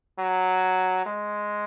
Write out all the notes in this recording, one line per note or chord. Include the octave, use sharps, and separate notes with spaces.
F#3
G#3